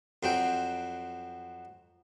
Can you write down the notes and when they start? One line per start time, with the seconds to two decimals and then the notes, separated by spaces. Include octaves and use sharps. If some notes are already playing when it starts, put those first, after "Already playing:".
0.23 F2 F#3 C4 G5